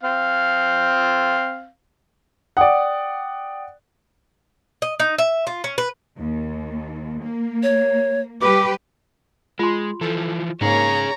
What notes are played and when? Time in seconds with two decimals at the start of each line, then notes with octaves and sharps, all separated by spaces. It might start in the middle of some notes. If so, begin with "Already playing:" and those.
0.03 C4 F5
2.57 D5 F#5 G5 D#6
4.82 D#5
5.00 D#4
5.18 E5
5.47 F4
5.64 C#4
5.78 B4
6.19 D#2
7.23 A#3
7.63 C#5
8.41 G3 G4 B4 D6
9.59 G#3 F4 C6
10.01 E3 F3 A4
10.61 G#2 A#3 C#4 G#4 C#5 A#5